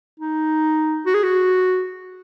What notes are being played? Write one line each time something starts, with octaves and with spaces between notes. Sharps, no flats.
D#4
F#4
G#4
F#4